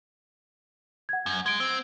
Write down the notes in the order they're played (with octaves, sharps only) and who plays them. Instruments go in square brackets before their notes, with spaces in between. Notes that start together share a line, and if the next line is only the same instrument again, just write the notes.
[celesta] F#5 G#6
[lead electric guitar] F#2
[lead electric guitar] G#3 [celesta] G#6 D7
[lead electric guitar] C4